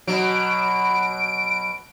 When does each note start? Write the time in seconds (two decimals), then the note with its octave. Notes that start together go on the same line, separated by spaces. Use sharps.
0.07 B2 F#3 D7